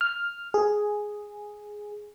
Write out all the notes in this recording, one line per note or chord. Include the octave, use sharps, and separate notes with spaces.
F6
G#4